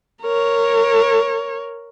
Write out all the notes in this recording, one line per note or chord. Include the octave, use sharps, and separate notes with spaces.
A#4 C#5